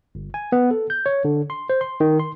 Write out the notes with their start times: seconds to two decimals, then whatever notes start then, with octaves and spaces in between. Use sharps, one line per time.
0.15 G1
0.34 G#5
0.52 B3
0.71 A4
0.90 G6
1.06 C#5
1.25 D3
1.50 C6
1.70 C5
1.81 C6
2.00 D#3
2.20 C6